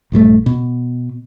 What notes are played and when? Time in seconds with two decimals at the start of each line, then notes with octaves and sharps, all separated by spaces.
0.12 A#1 G2 F3 A3
0.46 B2